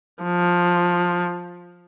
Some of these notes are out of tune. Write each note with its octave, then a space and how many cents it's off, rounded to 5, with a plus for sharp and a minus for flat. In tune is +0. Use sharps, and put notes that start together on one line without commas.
F3 +15